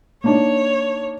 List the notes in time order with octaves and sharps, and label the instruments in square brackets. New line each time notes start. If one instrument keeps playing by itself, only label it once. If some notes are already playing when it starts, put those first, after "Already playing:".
[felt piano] A#3 D4 D#4 [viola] C#5